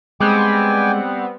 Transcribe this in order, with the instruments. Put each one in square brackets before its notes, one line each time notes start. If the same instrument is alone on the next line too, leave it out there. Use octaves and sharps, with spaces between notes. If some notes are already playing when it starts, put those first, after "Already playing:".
[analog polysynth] G3 B3 C4 [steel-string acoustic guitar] G#3 [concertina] G5 G#5 D6